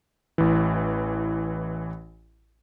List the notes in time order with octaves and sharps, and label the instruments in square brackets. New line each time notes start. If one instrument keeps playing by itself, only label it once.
[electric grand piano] A1 E3